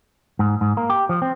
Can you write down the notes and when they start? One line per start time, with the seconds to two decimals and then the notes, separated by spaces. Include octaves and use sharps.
0.39 G#2
0.61 G#2
0.77 A#3
0.90 G4
1.09 F3
1.22 C4